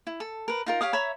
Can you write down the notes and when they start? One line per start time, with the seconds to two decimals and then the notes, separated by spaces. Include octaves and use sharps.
0.07 E4
0.20 A4
0.48 A#4 B4
0.66 D#4 F4 A#4
0.81 G4 C#5 F5 D#6
0.93 C#5 E5 A#5 B5